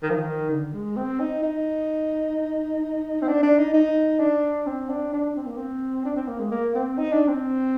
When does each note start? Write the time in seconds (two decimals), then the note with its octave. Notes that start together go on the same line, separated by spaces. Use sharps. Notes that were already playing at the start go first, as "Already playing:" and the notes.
0.03 D#3
0.10 F3
0.18 D#3
0.50 D3
0.73 G#3
0.97 C4
1.20 D#4
1.43 D#4
3.22 C4
3.28 D4
3.43 D4
3.59 D#4
3.74 D#4
4.20 D4
4.67 C4
4.89 D4
5.13 D4
5.36 C4
5.47 A#3
5.57 C4
6.05 D4
6.16 C4
6.28 A#3
6.39 G#3
6.52 A#3
6.75 C4
6.98 D#4
7.13 D4
7.28 C4